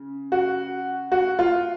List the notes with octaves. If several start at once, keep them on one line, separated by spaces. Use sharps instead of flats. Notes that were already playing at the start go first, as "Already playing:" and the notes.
Already playing: C#3
F#4
F#4
F4